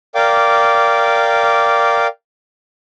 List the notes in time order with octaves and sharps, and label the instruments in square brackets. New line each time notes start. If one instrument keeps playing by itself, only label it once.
[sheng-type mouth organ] A#4 D5 F5 G5 D6